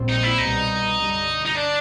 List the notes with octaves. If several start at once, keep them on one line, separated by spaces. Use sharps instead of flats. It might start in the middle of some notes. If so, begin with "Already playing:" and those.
Already playing: A#1 A#2 G3 C4
D#4
E4
C2 B2 G3 B3 D#4
G2 D3 G3
D#4
D4